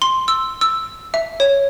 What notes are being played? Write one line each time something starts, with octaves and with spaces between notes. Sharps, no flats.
C6
E6
E6
E5
C#5